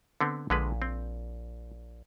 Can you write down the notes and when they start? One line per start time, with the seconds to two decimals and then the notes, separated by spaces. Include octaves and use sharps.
0.21 D3 B3 C4
0.50 A#1 D3 G#3 B4
0.82 C4